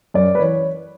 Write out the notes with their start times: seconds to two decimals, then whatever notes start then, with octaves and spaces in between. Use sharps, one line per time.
0.14 F#2 D5
0.35 B4
0.39 E3 C#5